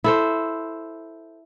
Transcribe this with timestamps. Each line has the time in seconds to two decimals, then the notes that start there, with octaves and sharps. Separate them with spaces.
0.04 E4 A4 C5